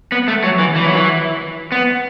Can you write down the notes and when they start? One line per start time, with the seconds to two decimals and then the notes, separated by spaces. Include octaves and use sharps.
0.12 B3
0.28 A3
0.44 F#3
0.59 E3
0.76 E3
0.85 F#3
0.95 E3
1.72 B3